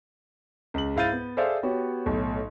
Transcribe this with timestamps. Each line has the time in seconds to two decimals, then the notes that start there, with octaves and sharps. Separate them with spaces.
0.74 C#2 F#7
0.96 G#2 E4 F5 G6 A6 D#7
1.12 B3
1.37 G#4 A4 C5 D5 E5 F5
1.63 B3 F#4 G4 C#5
2.06 B1 A2